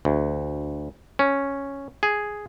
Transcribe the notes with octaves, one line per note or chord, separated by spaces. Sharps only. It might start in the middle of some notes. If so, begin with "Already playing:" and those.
D2
C#4
G#4